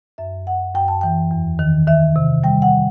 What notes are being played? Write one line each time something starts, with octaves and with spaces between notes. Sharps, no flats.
F#2 E5
F#2 F#5
F#2 G5
A5
E3 G5
E2
D#3
D#3 E5
C3
G3 G5
F#5